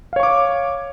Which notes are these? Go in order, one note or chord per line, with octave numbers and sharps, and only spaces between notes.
C#5 F5 C#6 D6